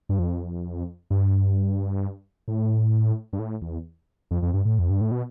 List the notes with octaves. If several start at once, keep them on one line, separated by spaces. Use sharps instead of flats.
G2
F2
G2
A2
G2
A2
E2
F2
F2
G2
A2
F2
G2
A2
B2